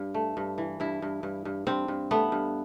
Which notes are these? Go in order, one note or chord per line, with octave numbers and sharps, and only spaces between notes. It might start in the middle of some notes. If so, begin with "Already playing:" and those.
Already playing: G2
A3
G2
E3
G2 E4
G2
G2
G2
G2 C4
G2
A3 B3
G2